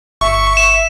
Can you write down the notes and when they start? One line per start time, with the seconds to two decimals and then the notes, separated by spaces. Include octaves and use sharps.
0.21 G1 E5 C#6
0.57 E7